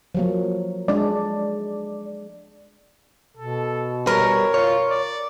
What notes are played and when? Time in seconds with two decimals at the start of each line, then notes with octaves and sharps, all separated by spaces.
0.15 F3 F#3 A#3
0.88 G#3 D4 D5
3.37 B2 A4
4.07 G3 A#4 B4 C#5
4.54 F4 C#5
4.90 D5